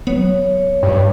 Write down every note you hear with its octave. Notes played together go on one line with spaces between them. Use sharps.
F#3 B3 C#5
G2